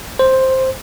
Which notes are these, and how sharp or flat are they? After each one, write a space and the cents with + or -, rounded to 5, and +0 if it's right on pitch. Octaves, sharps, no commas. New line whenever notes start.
C5 +5